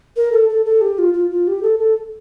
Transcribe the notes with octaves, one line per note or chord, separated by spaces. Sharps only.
A#4
A4
A4
A4
G4
F4
F4
F4
G4
A4
A4